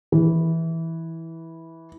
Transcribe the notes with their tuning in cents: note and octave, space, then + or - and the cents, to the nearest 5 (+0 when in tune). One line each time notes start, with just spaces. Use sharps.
E3 -10